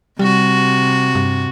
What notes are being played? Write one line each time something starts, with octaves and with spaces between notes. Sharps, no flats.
C3 G3 F#4
G2